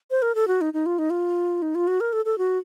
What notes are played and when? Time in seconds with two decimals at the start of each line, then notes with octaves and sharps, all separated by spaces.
0.11 C5
0.22 A#4
0.35 A4
0.48 F#4
0.61 D#4
0.74 D#4
0.86 F4
0.99 D#4
1.10 F4
1.62 D#4
1.75 F4
1.87 F#4
2.01 A#4
2.13 A4
2.25 A4
2.38 F#4